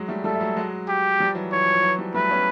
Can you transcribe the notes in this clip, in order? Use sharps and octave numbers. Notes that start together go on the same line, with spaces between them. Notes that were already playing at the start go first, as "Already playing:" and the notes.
Already playing: F#3 G#3
G3 A3
G3 A3 A4
A3
F#3 G#3
F#3 G#3
G4
F3 G3
E3 F#3
E3 C#5
F3
F3
E3 F#3
F3 G3
G3 A3 B4
B3 C#4